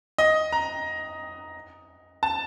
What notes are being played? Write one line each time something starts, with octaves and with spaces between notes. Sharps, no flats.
D#5
A#5
A5